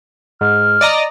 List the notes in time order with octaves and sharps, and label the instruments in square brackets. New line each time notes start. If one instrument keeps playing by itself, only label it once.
[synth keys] G#2 [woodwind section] F6
[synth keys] D5 D#5 A#5